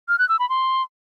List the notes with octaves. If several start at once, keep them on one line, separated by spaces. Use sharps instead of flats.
F6
F#6
E6
B5
C6